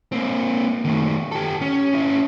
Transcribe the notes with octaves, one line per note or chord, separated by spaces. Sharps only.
A#3 C4
D#3 A3
G4 A4
C#4
C#4 E4